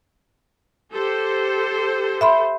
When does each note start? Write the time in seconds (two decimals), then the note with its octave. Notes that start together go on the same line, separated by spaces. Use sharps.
0.94 G4 A4 C5
2.21 E5 B5 C6